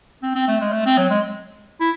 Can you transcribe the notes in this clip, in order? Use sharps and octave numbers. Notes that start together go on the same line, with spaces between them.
C4
C4
A3
G#3
A3
C4
F#3
G#3
E4